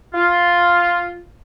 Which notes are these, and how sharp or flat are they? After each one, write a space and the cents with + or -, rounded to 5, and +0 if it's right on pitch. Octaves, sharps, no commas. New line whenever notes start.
F4 +0